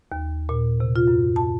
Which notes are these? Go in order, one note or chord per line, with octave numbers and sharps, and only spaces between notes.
D#2
A#2
C3
F4
F#2
A5